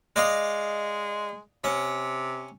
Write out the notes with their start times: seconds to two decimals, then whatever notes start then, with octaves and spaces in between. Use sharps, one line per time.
0.16 G#3 D5 D#5 F5
1.64 C3 C#4